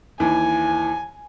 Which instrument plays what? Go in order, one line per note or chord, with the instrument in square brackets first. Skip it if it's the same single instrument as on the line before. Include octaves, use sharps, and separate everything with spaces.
[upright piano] D#2 E3 [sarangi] G#5